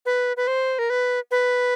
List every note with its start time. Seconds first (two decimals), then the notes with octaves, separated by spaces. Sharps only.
0.06 B4
0.37 B4
0.47 C5
0.79 A#4
0.90 B4
1.31 B4